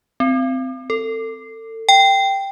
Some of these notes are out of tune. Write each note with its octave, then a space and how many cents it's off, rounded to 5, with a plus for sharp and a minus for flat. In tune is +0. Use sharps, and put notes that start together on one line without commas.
C4 -15
A4 +30
G5 +0